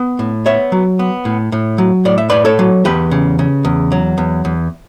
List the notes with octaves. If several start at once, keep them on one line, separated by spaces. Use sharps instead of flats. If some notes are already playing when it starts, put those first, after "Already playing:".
Already playing: B3
A2
B3 C#5 E5
F#3
B3
A2
A2
F#3
A2 D5
E5
A2 B4 D5
A4 C#5
F#3
E2 G4 B4
C#3
C#3
E2
F#3
E2
E2